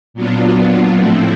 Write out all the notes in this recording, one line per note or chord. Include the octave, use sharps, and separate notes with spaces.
A#2 F#3 B3 D4 F4
A2 F3 A3 C4 E4